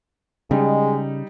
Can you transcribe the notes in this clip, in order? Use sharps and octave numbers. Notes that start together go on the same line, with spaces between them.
C#3 G3 G#3 D#4